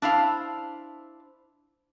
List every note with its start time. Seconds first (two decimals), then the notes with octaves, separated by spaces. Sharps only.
0.02 D4 E4 C5 F5